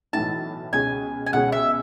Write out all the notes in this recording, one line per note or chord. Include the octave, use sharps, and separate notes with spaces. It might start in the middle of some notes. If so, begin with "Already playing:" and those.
B1 A2 E3 A5
C#2 B2 G#3 C#4 G#4 G#5
G#5
C#2 B2 G#3 C#4 G#4 F#5
E5